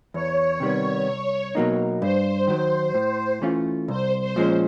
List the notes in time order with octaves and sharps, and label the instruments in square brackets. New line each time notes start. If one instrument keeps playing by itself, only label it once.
[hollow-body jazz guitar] E2 [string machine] C#5
[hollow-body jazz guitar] C3 D#3 G3 B3
C2
B2 F#3 A#3 D#4
[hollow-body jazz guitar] G2 [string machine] C5
[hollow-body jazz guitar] D#3 F#3
A2
E3 A3 C#4 F4
[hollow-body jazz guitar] C2 [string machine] C5
[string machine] C5
[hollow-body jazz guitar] A#2 F3 G#3 C#4